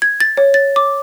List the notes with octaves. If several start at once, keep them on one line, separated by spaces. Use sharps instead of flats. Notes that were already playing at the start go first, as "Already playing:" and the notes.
G#6
A6
C#5
A6
D6